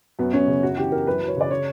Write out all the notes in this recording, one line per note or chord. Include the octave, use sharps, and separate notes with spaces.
F#2 B3
F#2 C#4
C#3
F#2 F#4
E3 G4
E3 A#4
F#2 B4
F#2
C#5
C#3 D5
C#5